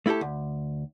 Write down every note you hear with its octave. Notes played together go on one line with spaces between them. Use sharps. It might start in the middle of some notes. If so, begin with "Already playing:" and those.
A3 E4 F4 G4 A4
D2